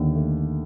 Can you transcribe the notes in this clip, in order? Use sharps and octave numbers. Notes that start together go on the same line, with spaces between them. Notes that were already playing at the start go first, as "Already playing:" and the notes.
Already playing: D#2 D3
A3